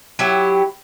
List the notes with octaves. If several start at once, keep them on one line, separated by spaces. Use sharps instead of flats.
F#3 E4 G4